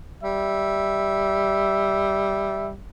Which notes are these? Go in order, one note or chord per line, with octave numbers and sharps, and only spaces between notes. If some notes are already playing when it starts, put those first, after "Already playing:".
G3 E5